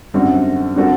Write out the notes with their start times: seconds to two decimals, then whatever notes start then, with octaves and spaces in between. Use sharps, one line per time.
0.14 F#2 D3 G3 C4 F#4
0.76 D3 G3 C4 F#4 A4